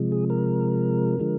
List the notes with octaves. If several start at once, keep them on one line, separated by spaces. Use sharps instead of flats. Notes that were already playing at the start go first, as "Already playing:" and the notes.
Already playing: C3 F3 G#3
G#4
A#4
D3 F3 G#3